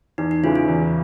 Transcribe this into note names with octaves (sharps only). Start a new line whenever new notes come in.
E2 D#4
D#4
C#3 E3 G#3 F4
F4
E2